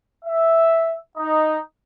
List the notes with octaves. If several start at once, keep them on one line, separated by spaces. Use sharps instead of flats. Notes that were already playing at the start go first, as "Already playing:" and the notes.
E5
D#4